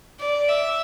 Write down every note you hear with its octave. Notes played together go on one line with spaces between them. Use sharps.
D5
E5